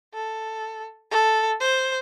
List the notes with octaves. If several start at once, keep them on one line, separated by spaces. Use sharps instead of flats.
A4
A4
C5